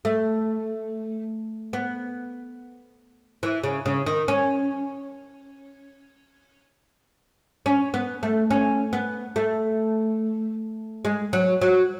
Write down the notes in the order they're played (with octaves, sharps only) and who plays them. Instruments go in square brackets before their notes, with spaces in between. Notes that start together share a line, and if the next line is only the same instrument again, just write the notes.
[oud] A3
B3
E3
C#3
C#3
D#3
C#4
C#4
B3
A3
C#4
B3
A3
G#3
F#3
F#3